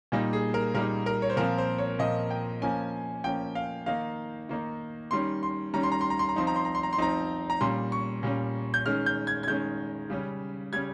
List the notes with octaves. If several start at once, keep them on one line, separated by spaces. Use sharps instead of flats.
A#2 G3 A#3 D#4
G#4
A#4
A#2 G3 A#3 D#4 A#4
A#4
C#5
C5
A#2 F3 C4 A#4
C5
C#5
A#2 F3 C4 D#5
G5
F3 A#3 C#4 G#5
F3 A#3 C#4 G5
F5
D#3 A#3 D#4 F5
D#3 A#3 D#4
D#3 G3 C#4 C6
C6
D#3 G3 C#4 A#5
C6
A#5
C6
A#5
C6
A#5
F3 C4 D#4 C6
A#5
C6
A#5
C6
A#5
C6
F3 C4 D#4 A#5
A#5
A#2 G3 C#4 C6
C#6
A#2 G3 C#4
G6
D#3 G#3 C#4 F6
G6
G#6
G#6
D#3 G#3 C#4 G6
C#3 G3 C#4
C#3 G3 C#4 G#6